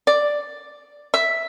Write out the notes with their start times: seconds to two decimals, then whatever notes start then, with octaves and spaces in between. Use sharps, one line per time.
0.07 D5
1.14 E5